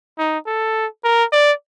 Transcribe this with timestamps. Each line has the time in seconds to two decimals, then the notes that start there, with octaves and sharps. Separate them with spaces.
0.18 D#4
0.46 A4
1.04 A#4
1.32 D5